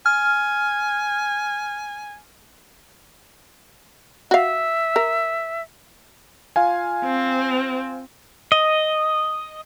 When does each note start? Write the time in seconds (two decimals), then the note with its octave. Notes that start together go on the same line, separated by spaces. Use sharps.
0.06 G#5 F6
4.31 F#4 E5 F5
4.96 A#4
6.56 F4 F5 G#5
7.05 C4
8.52 D#5